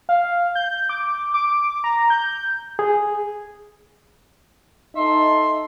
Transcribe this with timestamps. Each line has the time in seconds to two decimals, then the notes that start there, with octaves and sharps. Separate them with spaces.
0.09 F5
0.55 G6
0.89 D6
1.34 D6
1.84 A#5
2.10 G6
2.79 G#4
4.96 D#4 A4 E5 C6